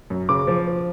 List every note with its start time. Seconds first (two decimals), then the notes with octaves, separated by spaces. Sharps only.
0.10 F#2
0.29 C#3 D6
0.47 F3
0.67 F3